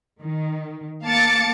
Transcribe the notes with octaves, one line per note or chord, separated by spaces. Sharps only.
D#3
A#3 F5 A5 D6 A6 C#7